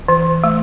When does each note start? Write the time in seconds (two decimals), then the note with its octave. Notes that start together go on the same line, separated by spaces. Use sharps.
0.08 E3
0.44 A3